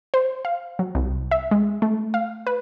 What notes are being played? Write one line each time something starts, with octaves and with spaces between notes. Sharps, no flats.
C5
F5
F#3
C2
E5
G#3
A3
F5
B4